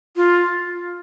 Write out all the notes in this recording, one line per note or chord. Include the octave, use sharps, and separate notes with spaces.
F4